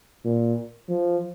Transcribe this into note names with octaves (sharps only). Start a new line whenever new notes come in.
A#2
F3